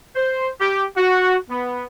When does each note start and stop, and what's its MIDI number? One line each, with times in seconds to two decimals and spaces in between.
0.16 0.49 72
0.60 0.83 67
0.96 1.35 66
1.50 1.85 59